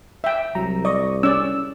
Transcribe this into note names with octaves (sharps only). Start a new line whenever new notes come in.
E5 G5
C2 F#3 A#5
D5 D#5 C#6
C#4 D5 E6